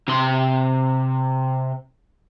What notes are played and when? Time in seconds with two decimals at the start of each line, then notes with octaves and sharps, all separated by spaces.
0.08 C3 C6